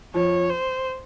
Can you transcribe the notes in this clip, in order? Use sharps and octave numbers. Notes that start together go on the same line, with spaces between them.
F2 F3 C#5
C5